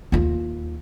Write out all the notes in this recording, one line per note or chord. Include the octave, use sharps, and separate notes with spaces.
D#2 F4